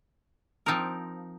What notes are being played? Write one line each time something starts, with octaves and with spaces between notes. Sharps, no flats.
F3 C4 D#4 A#4